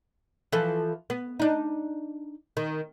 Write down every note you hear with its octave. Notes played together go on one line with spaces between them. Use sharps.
E3 F3 A4
B3
D4 D#4
D#3